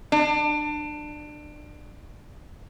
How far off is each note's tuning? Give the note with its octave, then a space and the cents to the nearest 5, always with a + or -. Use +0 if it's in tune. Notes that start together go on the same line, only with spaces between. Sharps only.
D4 +25